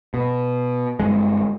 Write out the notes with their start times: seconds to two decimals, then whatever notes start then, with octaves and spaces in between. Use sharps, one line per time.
0.14 B2
1.00 G1 G#3